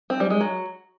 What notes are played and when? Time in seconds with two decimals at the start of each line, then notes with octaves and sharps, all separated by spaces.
0.10 C4
0.20 G3
0.30 G#3
0.41 F#3